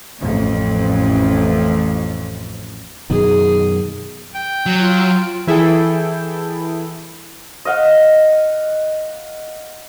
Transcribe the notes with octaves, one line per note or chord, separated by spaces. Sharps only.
A1 F2
F#2 B2 D#3 G#4
G5
F#3
F4
E3 E4 G#4 A4 G5
D#5 F5 F#5